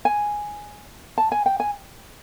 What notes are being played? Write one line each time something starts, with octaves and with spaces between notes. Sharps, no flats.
G#5
A5
G#5
G5
G#5